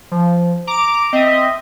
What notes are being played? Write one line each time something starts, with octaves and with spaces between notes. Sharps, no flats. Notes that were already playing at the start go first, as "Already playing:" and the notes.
F3
A#5 D6 D7
C4 D#5 E5